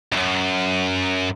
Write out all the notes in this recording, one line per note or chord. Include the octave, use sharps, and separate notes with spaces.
C#2 F#2